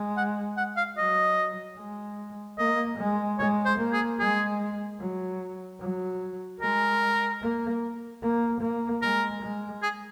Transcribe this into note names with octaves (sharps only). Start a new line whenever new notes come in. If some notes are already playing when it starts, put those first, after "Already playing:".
Already playing: G#3
F#5
F#5
F5
F#3 D#5
G#3
A#3 D#5
G#3
G#3 C#5
C5
A#3
G#4
G#3 G#4
F#3
F#3
G#3 A#4
A#3
A#3
A#3
G#3 A#4
G#3
G#4